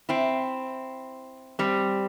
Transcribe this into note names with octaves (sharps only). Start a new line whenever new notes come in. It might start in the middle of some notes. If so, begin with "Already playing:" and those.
C4 E4
G3 C4